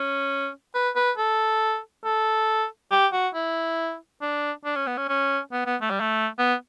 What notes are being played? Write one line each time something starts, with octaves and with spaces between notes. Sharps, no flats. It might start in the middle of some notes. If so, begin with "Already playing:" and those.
Already playing: C#4
B4
B4
A4
A4
G4
F#4
E4
D4
D4
C#4
B3
C#4
C#4
B3
B3
A3
G3
A3
B3